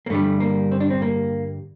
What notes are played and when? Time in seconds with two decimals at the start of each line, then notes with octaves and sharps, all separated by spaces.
0.06 A#3
0.10 G2 D3 G3 A3
0.40 A#3
0.72 C4
0.80 D4
0.90 C4
1.02 A#3